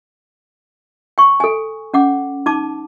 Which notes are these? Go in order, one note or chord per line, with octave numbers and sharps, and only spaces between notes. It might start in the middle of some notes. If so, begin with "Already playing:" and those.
G5 C#6
A4 G#5
C#4 F#5 D6
D#4 A5 D6